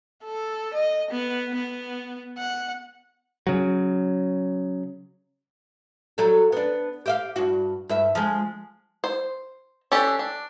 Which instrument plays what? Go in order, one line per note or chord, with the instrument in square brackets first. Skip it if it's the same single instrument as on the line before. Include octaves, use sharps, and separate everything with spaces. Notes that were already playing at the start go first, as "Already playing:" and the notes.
[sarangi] A4
D#5
B3
B3
F#5
[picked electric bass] C#3 F#3
[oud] F#3 G3 A4
B3 D4
G4 E5 F5
G2 F#4
G2 E5
F3 G#3
[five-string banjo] C5
C#4 D4 G4 A4
D4